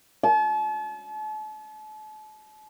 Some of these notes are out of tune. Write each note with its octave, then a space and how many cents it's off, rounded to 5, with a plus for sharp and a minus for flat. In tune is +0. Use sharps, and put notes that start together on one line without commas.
A5 -40